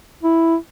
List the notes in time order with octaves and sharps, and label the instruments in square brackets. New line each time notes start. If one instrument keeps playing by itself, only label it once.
[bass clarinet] E4